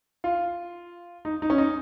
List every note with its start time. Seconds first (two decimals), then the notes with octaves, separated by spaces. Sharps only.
0.24 F4
1.25 D#4
1.42 D#4
1.50 C#4
1.58 D#4